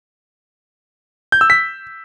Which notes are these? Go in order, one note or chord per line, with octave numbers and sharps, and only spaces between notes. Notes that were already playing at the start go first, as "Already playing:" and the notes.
G6
E6
B6